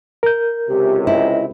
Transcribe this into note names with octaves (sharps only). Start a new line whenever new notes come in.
A#4 G6
C#2 C3 G4
E4 D#5